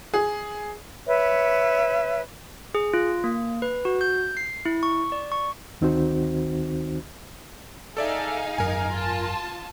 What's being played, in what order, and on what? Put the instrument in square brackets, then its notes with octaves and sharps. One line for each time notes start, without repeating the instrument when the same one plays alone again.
[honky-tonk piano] G#4
[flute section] B4 C#5 E5
[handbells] G#4
F4
A#3
B4
F#4
G6
C7
E4
C#6
D5
C#6
[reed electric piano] D2 D#3 C4 D#4 F#4 C5
[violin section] D#4 G#4 F5 [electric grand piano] A4 D5 E5
[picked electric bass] G#1 F#2 [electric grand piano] A#4 G#5
[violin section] F4 A5